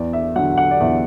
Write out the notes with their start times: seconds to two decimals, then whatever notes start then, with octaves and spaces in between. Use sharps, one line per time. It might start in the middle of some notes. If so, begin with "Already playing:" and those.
Already playing: E2 D5
0.13 E5
0.36 D3 F#3 F#5
0.58 F#5
0.71 D5
0.80 E2 E5